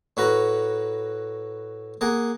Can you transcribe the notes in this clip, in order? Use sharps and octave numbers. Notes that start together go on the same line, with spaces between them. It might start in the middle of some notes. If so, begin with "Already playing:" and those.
A2 F#4 B4 A#5
A#3 G#4 F#5